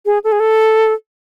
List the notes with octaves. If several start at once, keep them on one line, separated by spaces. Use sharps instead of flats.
G#4
A4
G#4
A4